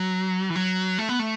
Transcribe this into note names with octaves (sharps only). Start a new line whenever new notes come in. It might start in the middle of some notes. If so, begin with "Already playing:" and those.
Already playing: F#3
E3
F#3
A3
B3
A3